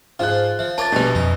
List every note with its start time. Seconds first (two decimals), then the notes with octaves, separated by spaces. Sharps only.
0.19 G#2 F3 F4 F#6
0.59 F3 E5
0.78 C#4 A#4 A5 D6 A6
0.92 A#1 B2 G3 D4 B4
1.15 F2 D#4